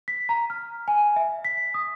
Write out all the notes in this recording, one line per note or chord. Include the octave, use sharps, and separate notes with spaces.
B6
A#5
F6
G#5
E5
B6
D#6